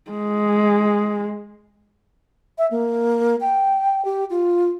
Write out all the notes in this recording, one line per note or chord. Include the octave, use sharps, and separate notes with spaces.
G#3
E5
A#3
G5
G4
F4